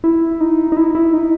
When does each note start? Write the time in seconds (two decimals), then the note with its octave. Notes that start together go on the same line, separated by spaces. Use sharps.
0.04 E4
0.40 D#4
0.72 D#4
0.77 E4
0.95 E4
1.13 D#4